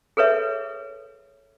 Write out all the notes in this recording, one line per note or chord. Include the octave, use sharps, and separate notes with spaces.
G#4 A4 B4 C#5 E5